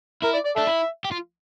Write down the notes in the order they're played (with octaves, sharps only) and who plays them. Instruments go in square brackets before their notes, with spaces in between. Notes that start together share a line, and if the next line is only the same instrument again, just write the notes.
[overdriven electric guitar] E4 [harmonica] A#4
[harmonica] D5
D5
[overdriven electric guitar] D4 [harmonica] A4 E5
[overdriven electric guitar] E4
G4
F4